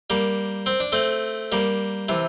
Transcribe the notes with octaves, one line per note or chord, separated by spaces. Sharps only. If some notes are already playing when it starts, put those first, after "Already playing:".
G3 A#3
C4
D4
A3 C4
G3 A#3
C3 E3